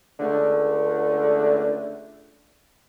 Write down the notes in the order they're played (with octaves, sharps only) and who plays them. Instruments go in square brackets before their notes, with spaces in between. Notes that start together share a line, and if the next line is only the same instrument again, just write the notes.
[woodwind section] C#2 D3 A3